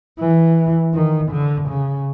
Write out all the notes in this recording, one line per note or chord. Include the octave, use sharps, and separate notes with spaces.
E3
D#3
D3
C#3